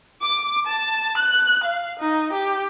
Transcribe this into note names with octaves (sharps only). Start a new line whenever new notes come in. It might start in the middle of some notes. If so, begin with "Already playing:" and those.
D6
A5
F#6
F5
D#4
G4